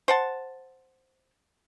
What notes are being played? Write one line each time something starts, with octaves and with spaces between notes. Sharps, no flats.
C5 F#5 A5